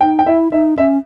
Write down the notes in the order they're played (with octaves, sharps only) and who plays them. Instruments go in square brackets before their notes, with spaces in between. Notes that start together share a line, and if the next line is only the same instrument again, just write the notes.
[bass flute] D#4 [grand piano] G5
[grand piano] G5
[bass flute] E4 [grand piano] E5
[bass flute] D#4 [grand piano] E5
[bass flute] C#4 [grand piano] E5